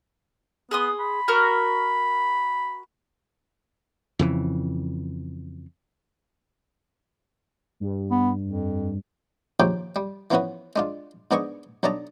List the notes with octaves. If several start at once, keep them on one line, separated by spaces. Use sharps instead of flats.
B3 G#4 C6 D#6
B5
F#4 A#4 F6
F2 C#3 E3
G2
B3
F2
A#1 D#2 F3 C#4 G4 G5
G3
E3 F3 B3 C#4 F#4 B4
G#3 D4 F4
G#2 B3 D4 G#4 D#5 C#6
B1 F#3 D4 D#5 A5 A#5